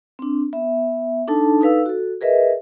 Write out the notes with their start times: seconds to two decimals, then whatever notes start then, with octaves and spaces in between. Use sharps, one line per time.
0.19 C4 D4
0.53 B3 E5
1.27 D4 D#4 A4 A5
1.61 D#4 A4 B4 F5 E6
1.86 F#4 A4
2.21 G#4 A#4 B4 D#5 E5